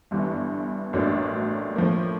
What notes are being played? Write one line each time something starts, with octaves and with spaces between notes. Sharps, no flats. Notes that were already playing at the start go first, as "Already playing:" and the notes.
G1 G2 E3
A1 A2 F#3 A#3 D4
A2 F3 A#3